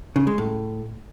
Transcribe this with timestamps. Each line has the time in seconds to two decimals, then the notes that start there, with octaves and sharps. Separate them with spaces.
0.16 C#3
0.27 G#3
0.38 A2